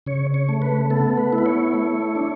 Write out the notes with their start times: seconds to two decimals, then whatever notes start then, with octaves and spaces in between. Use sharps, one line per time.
0.06 C#3 C#5
0.34 C#5
0.49 A3
0.62 B4
0.90 B3 A4
1.17 B4
1.33 E4
1.38 B4
1.46 C#5
1.74 A3
2.16 D4